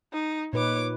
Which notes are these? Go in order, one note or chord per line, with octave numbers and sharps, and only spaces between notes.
D#4
A#2 D#4 B4 C#5 D6